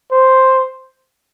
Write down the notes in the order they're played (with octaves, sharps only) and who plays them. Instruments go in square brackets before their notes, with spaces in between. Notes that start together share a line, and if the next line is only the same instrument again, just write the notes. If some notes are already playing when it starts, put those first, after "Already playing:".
[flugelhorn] C5